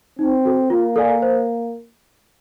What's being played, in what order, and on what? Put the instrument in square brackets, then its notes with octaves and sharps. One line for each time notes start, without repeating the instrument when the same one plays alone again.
[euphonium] C4 [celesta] D#4
[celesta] F#4 A4
[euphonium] A#3 [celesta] F4
[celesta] A4 D5 F5 G#5
C5